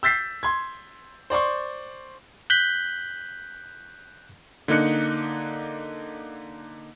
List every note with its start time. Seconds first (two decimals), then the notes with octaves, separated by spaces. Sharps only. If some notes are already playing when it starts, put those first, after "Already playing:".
0.03 E6 G6 A6 B6 C7
0.43 C6 G#6
1.30 C5 D5 C6 C#6
2.50 F#6 G6 B6
4.68 D3 A#3 D#4 F#6 C#7